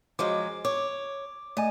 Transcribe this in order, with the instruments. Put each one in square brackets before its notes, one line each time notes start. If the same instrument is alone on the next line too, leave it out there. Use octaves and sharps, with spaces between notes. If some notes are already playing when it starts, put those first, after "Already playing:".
[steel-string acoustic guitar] F3 F#3 G#3 [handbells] D6
[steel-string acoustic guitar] C#5 [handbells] D6
[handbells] A3 D5 G#5 [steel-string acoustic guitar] D#5